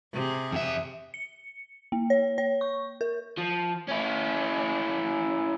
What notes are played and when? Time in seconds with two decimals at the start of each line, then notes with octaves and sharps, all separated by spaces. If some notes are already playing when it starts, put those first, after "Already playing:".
0.13 C3 G#4
0.52 F2 E5
1.14 C#7
1.92 A#3
2.10 C#5
2.38 C#5
2.61 C#6
3.01 A#4
3.38 F3
3.88 C#4 E4